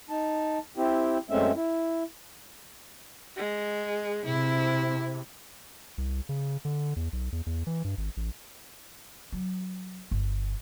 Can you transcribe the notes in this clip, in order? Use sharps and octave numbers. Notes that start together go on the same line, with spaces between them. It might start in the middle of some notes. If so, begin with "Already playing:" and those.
D#4 A5
C4 E4 G4
F#2 G#3 A3 C4 C#4 E5
E4
G#3
C3 E4
C2
C#3
D3
E2
B1
E2
E2
E3
G2
G#1
A1
F#3
G1